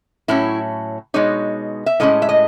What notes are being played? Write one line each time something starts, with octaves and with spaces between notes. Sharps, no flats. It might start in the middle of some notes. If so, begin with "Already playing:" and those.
A2 F#3 C#4 E4
B2 G#3 D#4 C#5
E5
A2 G#3 C#4 D#5
E5
D#5